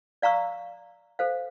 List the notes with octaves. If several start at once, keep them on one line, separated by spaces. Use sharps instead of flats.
D5 F5 A#5 C#6 E6
A4 C5 F5